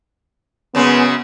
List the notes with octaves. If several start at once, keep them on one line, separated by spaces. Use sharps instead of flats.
F#2 C#3 G#3 B3